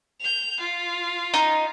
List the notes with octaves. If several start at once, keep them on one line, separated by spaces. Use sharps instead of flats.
G6 F7
F4
D#4